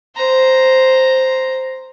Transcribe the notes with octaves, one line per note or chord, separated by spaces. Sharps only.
C5 A#5